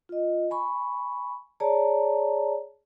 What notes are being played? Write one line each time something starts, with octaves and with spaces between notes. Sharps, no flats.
F4 D#5
G#5 B5 C#6
G#4 C#5 D5 A5 A#5